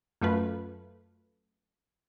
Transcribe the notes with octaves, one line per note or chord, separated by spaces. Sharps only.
F#2 A3 F4 B4